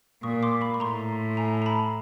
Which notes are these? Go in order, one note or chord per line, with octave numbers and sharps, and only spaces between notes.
A#2 C#6 D#6
C6 D6
B5 C#6
C#6
A2 A#5 C6
G#5 A#5
A#5
A5 B5